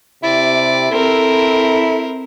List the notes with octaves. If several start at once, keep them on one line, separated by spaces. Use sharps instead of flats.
C3 E4 D5
C4 A4 A#4